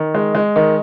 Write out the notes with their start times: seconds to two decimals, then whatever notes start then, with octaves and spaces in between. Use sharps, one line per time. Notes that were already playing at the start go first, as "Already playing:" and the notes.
Already playing: D#3
0.15 G#3
0.35 G#3
0.56 D#3